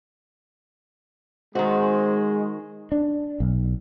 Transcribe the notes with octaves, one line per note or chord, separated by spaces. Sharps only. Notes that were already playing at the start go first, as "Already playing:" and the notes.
D#3 G#3 C4 F#4
D4
B1